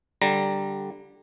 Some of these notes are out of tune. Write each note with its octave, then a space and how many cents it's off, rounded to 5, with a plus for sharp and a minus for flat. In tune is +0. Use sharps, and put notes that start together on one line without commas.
D3 +0 G3 +0 A#5 +0